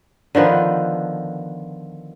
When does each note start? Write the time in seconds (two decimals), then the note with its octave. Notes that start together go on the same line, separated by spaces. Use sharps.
0.35 D3 D#3 F3 B3